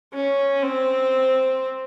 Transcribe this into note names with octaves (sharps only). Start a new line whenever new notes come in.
C#4
C4